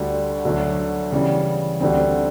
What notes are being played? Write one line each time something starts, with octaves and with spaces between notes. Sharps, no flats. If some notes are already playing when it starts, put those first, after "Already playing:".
Already playing: D2 D3 G3
D2 D3 F#3
C#3 E3 G3
D2 D3 G3 C4